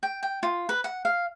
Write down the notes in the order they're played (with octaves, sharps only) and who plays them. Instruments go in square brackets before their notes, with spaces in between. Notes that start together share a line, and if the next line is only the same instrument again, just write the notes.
[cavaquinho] G5
G5
F4
B4
F#5
F5